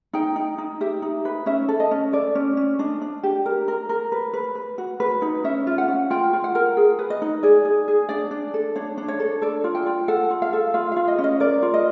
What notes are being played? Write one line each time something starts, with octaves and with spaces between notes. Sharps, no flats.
D#4 G5
D#4
D#4
G4 E5
D#4
B4
C#4 E5
A4
D#5
C#4
A4 D5
C#4
C#4
D4 D#5
D4
G4
A#4
A#4
A#4
B4
B4
B4
F#4
B4
D#4
C#4 E5
F4
F#5
C#4
F4 G5
F4
F#5
A#4
G#4
B4
D#5
D#4
G#4 D5
G#4
G#4
D4 D5
D4
A4
D4 C#5
D4
C#5
A4
A4 D5
F4
G5
F4
A4 F#5
F4
F5
A4
F4 F5
F4 F5
D#5
C#4
D#5
A#4 D5
F4
D#5